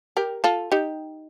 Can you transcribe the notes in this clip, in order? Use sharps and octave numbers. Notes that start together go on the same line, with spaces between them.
G4 A#4
F4 A4
D#4 G4